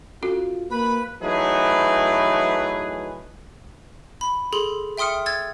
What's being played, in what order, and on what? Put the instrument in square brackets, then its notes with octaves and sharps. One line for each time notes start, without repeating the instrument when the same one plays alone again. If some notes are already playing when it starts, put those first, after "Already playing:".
[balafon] C#4 F#4 A4 [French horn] F4
[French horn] A#3 [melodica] B4 [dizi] B5
[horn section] E3 F#3 A3 D#4 G#4 B4
[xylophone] B5
G#4 A4 C6 F#7
E5 G5 C6 D#6 F6 C#7
E6 G#6 A6